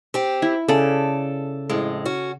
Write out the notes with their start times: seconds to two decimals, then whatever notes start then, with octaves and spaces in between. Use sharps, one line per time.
0.14 C4 G4
0.42 E4
0.68 C#3 A4 D5
1.69 F2 A2 G#3
2.05 C#4 F#4